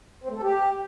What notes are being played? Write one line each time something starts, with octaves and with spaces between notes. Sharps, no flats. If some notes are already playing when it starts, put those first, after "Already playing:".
C4
A3
A4
G4